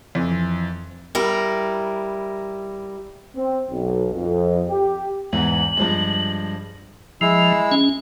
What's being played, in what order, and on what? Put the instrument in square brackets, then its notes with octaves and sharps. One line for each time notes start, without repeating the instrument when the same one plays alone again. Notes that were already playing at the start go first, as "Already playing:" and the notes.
[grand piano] F2 E3
[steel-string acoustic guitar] G3 E4 A#4
[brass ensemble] C4
B1
F2
G4
[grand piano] E2 G#2 E3 [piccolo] F#7
[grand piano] G2 F3 G#3
[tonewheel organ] F3 [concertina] G#3 E4 E6
[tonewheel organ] C#4